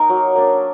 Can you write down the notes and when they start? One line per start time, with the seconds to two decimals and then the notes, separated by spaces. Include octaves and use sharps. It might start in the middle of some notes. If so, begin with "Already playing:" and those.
Already playing: A#3 D#4 A#4
0.10 F#3
0.36 A#3 D4